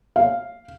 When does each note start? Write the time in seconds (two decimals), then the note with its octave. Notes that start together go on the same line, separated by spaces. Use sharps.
0.16 F5